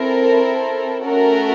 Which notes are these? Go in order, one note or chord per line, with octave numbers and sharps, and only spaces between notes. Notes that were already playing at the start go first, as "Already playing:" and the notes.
Already playing: C4 E4 A4 A#4
A3 C#4 F#4 A4 A#4